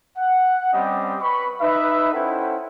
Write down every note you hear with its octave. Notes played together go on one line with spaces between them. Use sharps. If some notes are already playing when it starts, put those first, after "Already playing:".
F#5
G3 C4 C#4 G4 D#5 G5
B4 B5 C#6
D#4 B4 E5
C#4 E4 A4 C5 F#5 G5